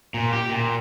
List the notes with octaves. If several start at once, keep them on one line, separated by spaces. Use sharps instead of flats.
A#2
G4
A#2